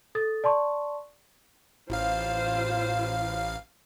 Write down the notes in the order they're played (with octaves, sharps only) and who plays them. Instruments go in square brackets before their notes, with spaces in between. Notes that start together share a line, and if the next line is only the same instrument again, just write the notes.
[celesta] A4 D#6 A6
D5 A5 C6 C#6
[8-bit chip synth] A1 F5 [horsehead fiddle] F4 C5